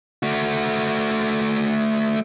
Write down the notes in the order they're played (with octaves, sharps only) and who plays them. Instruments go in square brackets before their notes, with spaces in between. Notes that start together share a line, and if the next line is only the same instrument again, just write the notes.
[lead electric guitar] A3 F#4